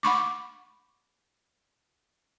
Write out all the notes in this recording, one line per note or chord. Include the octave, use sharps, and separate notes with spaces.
F#5 B5 C#6 D6